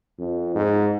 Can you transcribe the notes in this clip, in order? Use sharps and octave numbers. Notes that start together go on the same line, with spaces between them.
F2
G#2